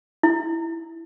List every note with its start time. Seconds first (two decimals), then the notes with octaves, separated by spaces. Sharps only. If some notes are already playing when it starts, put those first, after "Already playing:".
0.23 E4